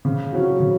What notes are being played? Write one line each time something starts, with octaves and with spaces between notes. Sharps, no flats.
C#3
F#3 C#4 F#4
C#3